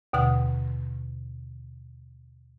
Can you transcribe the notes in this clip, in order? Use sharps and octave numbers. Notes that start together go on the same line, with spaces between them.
D#2 B2 D3 F#5 D#6